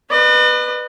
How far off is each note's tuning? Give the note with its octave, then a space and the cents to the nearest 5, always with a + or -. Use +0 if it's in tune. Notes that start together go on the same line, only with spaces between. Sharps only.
B4 +0 D#5 -45